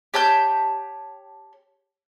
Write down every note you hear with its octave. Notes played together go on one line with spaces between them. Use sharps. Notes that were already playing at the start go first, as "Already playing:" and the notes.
G4 C#5 A5 G6